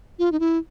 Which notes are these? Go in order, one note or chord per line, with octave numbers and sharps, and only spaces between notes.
F4
D#4
E4